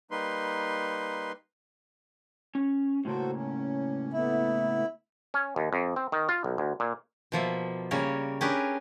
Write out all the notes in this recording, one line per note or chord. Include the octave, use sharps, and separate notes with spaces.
G3 A#3 D#4 B4 C6
C#4
A2 C#3 A#3 F#4 A4 C5
C#4
A3 B3 E4
C#4
D#2
F2
C4
D#3
F4
B1
D2
A#2
B2 F3 A#3 E5
C#3 G3 A#3 A#4 C#5
C#4 D4 G4 G#4 A#4 B4